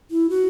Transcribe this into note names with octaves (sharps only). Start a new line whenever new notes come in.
E4
F#4